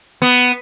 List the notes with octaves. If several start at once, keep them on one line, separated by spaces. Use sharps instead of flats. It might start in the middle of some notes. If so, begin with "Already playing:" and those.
B3